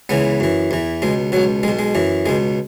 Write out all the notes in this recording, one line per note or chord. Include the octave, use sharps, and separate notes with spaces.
C#2 C#3 E3 B3
F#2 E3
E2 E3
C#2 B2 G#3
C#2 B2 F#3
B1 B2 G#3
G#3
F#2 E3
C#2 B2 G#3